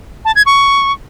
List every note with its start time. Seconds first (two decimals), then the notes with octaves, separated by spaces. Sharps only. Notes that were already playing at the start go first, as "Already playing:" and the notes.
0.25 A5
0.35 G#6
0.46 C#6